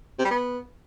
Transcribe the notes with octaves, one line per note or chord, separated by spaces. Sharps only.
C3
G3
B3